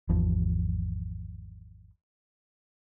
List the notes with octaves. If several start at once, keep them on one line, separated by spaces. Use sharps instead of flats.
G#1 E2 F3